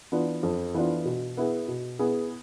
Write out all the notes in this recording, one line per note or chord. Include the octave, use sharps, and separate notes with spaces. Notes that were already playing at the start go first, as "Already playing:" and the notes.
E3 B3 D4 F4
F2
E3 B3 D4 F4
B2
B3 E4 G#4
B2
B3 E4 G#4